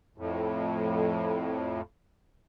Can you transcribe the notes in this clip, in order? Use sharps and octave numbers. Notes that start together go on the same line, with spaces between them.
F2 A2